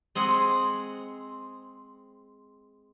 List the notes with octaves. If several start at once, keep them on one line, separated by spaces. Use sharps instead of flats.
G#3 C4 G#4 F#5